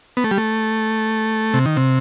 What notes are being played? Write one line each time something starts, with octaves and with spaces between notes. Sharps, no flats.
B3
A3
G3
A3
C3
D#3
C3